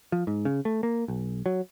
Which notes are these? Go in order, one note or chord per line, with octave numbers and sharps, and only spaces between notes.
F3
G#2
C#3
A3
A#3
B1
F#3